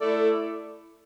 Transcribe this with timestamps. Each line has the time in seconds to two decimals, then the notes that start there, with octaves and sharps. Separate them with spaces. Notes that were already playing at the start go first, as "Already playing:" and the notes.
0.01 A3 E4 A4 D5